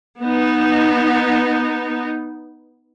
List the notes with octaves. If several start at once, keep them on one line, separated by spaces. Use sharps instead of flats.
B3 D#4